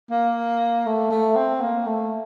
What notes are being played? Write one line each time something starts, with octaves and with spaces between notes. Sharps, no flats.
A#3
A3
A3
C4
A#3
A3